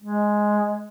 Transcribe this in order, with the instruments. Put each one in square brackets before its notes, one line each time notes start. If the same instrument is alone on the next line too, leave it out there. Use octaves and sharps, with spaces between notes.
[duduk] G#3